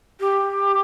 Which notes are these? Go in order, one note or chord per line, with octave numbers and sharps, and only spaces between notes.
G4